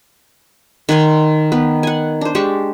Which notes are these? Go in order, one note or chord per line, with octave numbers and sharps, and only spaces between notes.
D#3 F#5 G#5 C6
B3 B4
F#5 G#5
D4 C5
G#3 D4 G4 C#6